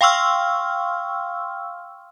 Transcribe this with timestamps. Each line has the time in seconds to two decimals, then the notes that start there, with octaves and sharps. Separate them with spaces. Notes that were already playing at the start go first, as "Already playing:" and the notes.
0.01 F5 G5 C6 C#6 E6 F6